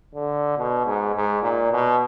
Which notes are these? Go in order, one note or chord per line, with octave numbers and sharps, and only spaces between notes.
D3
B2
G#2
G#2
A#2
B2